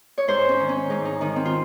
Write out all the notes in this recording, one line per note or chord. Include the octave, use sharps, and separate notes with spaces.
C#5
G#2 C5
C#4
D#3
C#4
G#2 D#4
D#4
D#3 D#4
C4
F4